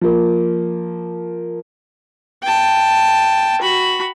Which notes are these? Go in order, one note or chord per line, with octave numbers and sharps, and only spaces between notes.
F3 A#3
G5 A5
F#4 B5